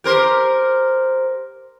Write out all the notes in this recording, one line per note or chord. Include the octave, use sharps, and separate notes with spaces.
G4 A#4 C5